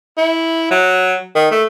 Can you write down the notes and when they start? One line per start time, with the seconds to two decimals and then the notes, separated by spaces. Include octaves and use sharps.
0.17 E4
0.71 F#3
1.35 D#3
1.51 A3